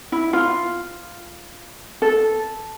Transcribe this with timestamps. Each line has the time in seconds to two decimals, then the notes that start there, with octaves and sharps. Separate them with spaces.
0.12 E4
0.33 F4
2.02 A4